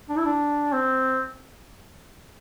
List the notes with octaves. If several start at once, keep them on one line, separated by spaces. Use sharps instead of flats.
D4
E4
D4
C4